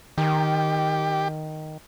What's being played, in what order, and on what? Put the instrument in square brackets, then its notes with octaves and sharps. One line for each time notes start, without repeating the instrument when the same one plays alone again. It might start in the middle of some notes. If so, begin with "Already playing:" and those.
[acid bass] D#3 [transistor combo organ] G4